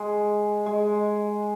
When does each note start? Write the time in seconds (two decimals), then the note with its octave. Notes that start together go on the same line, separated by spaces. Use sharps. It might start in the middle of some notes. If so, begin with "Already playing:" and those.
Already playing: G#3
0.66 G#3